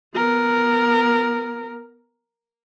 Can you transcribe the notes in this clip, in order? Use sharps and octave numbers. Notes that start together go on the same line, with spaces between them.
B3 A#4